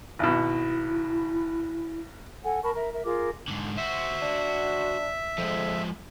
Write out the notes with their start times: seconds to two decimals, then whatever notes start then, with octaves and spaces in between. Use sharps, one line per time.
0.19 G#1 B2 E4
2.44 A4 F#5 G#5
2.63 A#4 A5 B5 C#6
2.75 A#4 E5 A#5
2.93 A#4 E5
3.05 F4 G#4 A#4 D6
3.48 G#2 D3
3.77 F#4 C5 E5
4.22 D4
5.38 F2 F3 G#3